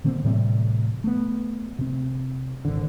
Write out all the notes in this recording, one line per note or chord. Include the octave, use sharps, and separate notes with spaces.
B2 D3 A#3 C4
A2 C3 E3 G3
A3 B3
C3 C4
G#1 D3